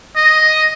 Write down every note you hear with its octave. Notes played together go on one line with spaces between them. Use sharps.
D#5